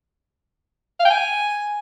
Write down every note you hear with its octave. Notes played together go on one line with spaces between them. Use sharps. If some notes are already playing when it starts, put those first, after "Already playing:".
F5
G5
G#5